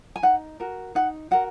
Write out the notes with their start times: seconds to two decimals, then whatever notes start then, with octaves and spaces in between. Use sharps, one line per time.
0.16 G#5
0.23 D#4 F#5
0.60 F#4 A#4
0.95 D#4 F#5
1.31 F#4 A#4 F#5